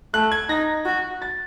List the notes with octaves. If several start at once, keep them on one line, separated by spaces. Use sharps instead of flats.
A3 F#6
G#6
D#4 A#6
F#4
A6